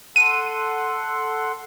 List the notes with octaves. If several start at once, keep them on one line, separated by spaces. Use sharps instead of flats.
A4 F#5 C6 D#7